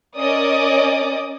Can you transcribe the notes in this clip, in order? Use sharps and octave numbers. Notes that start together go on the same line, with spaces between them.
C#4 A#4 D5 D#5 D6 D#6